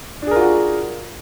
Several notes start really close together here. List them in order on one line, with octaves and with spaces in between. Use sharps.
D4 G#4 A#4 F4 F#4